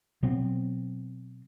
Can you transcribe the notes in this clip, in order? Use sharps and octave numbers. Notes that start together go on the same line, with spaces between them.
B2 F#3 B3 C4